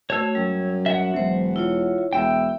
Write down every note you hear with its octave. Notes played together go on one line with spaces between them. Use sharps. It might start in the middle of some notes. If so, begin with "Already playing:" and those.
A3 F#4 C#5 A5 E6
F#2 G3
E5 F#5
E1 F#3 C5
E4 F4 C#5
E1 B3 E5 G5 E6